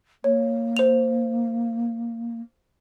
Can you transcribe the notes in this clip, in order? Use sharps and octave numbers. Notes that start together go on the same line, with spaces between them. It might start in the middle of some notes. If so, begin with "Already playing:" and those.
A#3 C#5
C5 F7